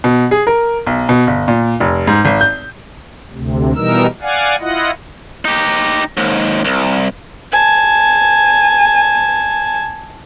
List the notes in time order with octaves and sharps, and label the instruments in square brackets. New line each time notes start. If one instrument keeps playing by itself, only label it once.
[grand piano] B2
G#4
A#4
B1
B2
G1
A#2
F1
G#2
G#1
G6
[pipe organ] D2 C3
B2 E3 G3 D#4 A#4 E6
D5 F5 F#5 G#5
E4 F4 D#5 F#5
[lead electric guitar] D#4 G4
D#2 G#2
C2
[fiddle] G#5 A5